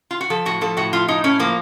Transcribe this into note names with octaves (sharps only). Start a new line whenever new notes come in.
F4
F#4
F3 A4
A2 F#4
F3 A4
A2 F#4
F3 F4
A2 D#4
A2 C#4
F3 A#3